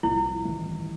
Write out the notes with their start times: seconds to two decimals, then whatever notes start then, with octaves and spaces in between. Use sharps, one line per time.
0.03 C2 A#2 F3 E4
0.43 A1 G2 D#3